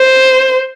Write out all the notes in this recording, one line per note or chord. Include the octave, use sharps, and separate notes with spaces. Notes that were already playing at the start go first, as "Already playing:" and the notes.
Already playing: C5